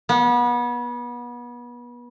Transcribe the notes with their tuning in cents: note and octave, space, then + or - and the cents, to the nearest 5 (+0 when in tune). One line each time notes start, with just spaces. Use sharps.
B3 -30